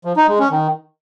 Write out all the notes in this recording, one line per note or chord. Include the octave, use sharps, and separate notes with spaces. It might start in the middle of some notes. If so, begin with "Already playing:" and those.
F3
D#4
G#3
C#4
D#3